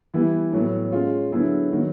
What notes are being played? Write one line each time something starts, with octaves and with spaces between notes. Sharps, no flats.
E3 G3 B3 E4
A2 F#3 B3
G#3 C#4 F4
D3 F#3 B3 E4 G#4
D#3 F#3 B3